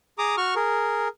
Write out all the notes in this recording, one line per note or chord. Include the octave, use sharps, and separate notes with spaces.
G#4 A#5 D6 D#6
F#4 C#6 F6
G#4 A#4